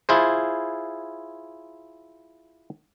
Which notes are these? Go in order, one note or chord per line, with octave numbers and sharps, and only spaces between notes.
E4 F4 G#4 C5